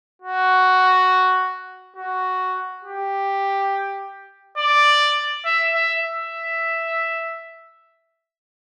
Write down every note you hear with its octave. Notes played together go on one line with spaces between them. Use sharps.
F#4
F#4
G4
D5
E5
E5
E5